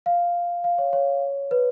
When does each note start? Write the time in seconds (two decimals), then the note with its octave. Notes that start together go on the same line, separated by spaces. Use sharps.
0.06 F5
0.64 F5
0.78 C#5
0.93 C#5
1.51 B4